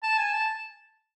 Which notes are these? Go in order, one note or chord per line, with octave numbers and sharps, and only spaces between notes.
A5
G#5
A5